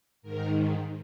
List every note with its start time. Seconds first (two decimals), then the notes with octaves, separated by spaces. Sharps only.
0.22 G#2 D#3 A#4